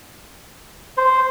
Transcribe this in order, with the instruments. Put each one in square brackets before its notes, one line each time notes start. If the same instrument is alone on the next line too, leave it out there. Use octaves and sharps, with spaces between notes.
[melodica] C5